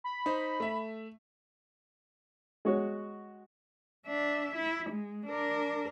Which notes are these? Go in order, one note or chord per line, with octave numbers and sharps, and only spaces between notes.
B5
D#4 C5
A3 E5
G#3 F#4 C#5
D4 E5
E4
G#3
D4 A#4